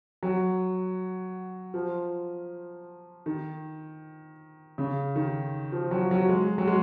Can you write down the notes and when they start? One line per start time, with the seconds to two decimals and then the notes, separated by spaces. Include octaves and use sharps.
0.23 F#3
1.74 F3
3.26 D#3
4.78 C#3
5.16 D#3
5.72 F3
5.91 F#3
6.11 F#3
6.29 G#3
6.58 F#3
6.67 G#3